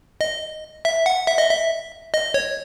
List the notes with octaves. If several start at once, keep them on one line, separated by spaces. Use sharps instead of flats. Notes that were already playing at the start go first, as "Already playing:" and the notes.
D#5
E5
F#5
E5
D#5
E5
D#5
C#5